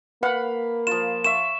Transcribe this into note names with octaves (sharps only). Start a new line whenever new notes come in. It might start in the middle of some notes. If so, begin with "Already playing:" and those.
A#3 B4 F5 F#5 B5
F3 F4 E7
E5 C#6 D6 E7